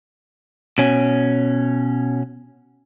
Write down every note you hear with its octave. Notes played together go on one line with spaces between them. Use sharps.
B2 C#4